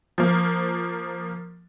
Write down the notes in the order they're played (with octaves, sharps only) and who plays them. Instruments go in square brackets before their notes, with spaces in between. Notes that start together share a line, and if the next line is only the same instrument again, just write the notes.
[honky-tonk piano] F3 A#3